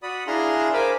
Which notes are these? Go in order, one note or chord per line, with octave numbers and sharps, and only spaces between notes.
F#4 D5 B5 D#6
D4 E4 G#4 F5 A#5 C6
A#4 C5 F5 G#5 B5 D6